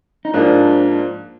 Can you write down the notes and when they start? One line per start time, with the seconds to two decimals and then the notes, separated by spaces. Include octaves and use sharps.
0.25 D#4
0.34 G#2 F3 A#3 D4